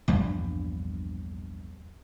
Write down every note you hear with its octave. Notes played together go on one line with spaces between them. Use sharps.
A#1 E2 G2 G3